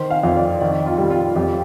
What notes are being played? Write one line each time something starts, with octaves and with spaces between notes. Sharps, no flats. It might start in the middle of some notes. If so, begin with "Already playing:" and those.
Already playing: D#3 C5
F5
F2
D5
D#3 D5
F4
G3
F4
F2 G4